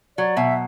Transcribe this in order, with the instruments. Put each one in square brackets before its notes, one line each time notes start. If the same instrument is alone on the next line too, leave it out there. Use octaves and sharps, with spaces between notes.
[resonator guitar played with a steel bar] F#3 [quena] D5
[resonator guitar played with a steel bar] B2 [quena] E5